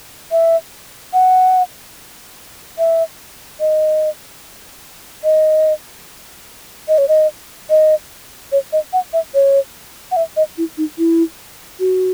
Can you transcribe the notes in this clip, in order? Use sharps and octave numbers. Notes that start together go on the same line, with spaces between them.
E5
F#5
E5
D#5
D#5
D#5
C#5
D#5
D#5
C#5
D#5
F#5
E5
C#5
F#5
E5
D#5
E4
D#4
E4
F#4